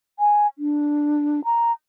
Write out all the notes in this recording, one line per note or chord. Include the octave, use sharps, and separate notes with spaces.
G#5
D4
A#5